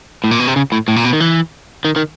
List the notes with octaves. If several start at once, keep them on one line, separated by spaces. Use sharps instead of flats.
A2
A#2
B2
C3
C#3
A2
A2
A#2
B2
D#3
E3
D#3
D#3